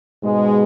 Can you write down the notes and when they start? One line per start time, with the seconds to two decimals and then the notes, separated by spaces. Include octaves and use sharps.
0.22 G#2 B2 G#3